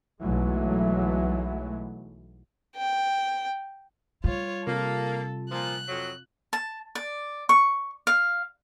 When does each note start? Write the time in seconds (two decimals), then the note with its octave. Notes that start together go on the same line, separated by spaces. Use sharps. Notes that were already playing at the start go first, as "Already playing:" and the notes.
0.22 B1 E3 F#3 G#3 A3
2.76 G5
4.24 G3 F4 C#5
4.67 C3 A#3 F4 A4
5.51 A#2 F3 F#6
5.88 F2 F#3
6.53 A5
6.95 D5
7.49 C#6
8.07 F5